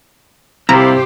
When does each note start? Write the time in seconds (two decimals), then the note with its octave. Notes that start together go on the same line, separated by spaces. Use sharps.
0.69 C2 C3 E4 F4 G4 C5 A#5